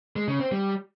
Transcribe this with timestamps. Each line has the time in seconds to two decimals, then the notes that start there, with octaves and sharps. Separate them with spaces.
0.16 G#3
0.28 C#3
0.40 C4
0.52 G3